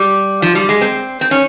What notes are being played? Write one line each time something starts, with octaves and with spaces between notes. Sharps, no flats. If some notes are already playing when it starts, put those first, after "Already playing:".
Already playing: G3
F3
G3
G#3
C4
C4
C#4